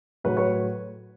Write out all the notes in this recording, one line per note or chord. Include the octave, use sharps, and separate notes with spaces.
A2 F#3 A3 B4 C#5
B4 C#5